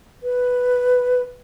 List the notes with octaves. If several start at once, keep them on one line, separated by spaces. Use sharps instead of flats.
B4